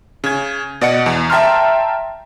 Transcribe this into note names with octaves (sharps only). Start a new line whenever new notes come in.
C#3 G#6
B2 D5 D#5 F#5 C#7
E2
E5 G5 A5 A#5 C6 F6